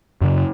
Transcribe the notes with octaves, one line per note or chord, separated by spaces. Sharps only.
F#2 C#3